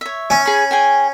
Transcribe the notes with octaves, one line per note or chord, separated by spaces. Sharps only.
C#5 E5
C#4
G#4 B5
G#4 G5 G#5